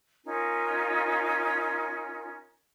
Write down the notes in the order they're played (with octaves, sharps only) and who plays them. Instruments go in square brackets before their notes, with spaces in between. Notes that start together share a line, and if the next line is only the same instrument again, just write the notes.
[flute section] C#4 D#4 F4 A#4